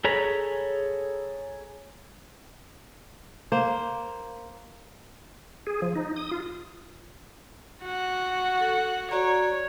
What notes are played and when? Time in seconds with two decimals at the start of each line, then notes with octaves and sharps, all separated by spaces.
0.04 G#4 A4 C#5 A#5 B5
3.52 A#3 C5
5.67 G#4
5.82 F3
5.95 D#4
6.16 D#6
6.31 F4
7.83 F#4 F#5
8.60 A4
9.11 F#4 C#5 D5 A#5